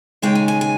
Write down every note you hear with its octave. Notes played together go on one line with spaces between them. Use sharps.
D#2 C#3 G#3 D#4 G5
G#5
G#5
G#5